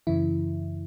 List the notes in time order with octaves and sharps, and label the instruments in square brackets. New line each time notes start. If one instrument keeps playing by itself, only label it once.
[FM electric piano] F#2 C#3 E3 E4